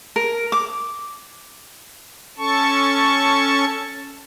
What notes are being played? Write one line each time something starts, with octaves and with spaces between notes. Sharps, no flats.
A#4
D6
C#4 A4 A5 C#6